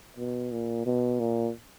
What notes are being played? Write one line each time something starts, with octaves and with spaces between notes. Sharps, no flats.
B2
A#2
B2
A#2